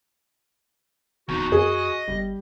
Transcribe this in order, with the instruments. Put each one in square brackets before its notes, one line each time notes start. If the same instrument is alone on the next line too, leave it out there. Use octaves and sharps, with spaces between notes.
[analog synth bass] D#1 [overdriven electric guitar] E2 D#4 [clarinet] F#4
[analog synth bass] F#2 [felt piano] G#4 [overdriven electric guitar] D#5
[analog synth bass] G1 [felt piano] G3